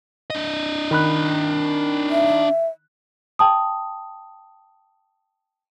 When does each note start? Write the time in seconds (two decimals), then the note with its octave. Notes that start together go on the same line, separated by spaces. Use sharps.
0.30 D4 D#5
0.91 D#3 B5 F#6
2.10 E5
3.39 G5 A5 D#6